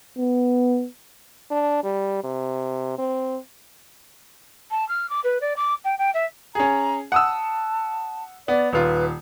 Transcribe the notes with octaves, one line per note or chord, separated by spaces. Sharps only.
B3
D4
G3
C3
C4
A5
F6
D6
B4
D5
D6
G5
G5
E5
C#4 G#4 A#5
F#5 A5 D#6 E6
B3 D5
D#1 F4 B4